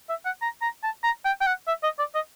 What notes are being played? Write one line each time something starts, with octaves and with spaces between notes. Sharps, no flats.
E5
F#5
A#5
A#5
A5
A#5
G5
G5
F#5
E5
D#5
D5
D#5